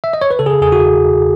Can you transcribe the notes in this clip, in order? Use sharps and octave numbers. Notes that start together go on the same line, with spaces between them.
E5
D#5
C#5
B4
C#3 A4
G#4
A4
E2 G#4
F#4